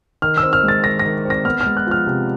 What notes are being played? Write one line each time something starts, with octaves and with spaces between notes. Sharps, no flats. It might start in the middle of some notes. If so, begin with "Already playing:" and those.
D#3 F6
E6
C4
F6
G#3
A6
D#3 A#6
A#6
D#3
C4
A#6
B3 F6
F6
G#3
F#6
F3 F6
C3